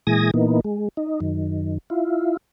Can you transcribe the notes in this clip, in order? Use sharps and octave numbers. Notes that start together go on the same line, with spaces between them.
A#2 E3 G#3 G#5 D#6 A#6
A#2 E3 A#3 B3 D#4
G#3
D#4
F#2 D#3
E4 F4